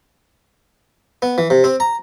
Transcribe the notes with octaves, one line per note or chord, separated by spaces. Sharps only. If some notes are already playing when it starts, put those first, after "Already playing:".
B3
E3
C3
C4
A#5